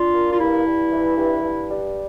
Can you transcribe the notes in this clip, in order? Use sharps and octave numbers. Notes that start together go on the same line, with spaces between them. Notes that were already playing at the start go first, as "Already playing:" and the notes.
Already playing: D4 F4
A#3
F4
G2 E4
G2
E3
G2
G2
G3